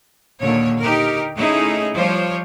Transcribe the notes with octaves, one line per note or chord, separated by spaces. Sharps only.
D#2 A#2 D3 C#5
D#4 G4 A#4
A3 C#4 D#4 E4 G#4
F3 G3 C5 C#5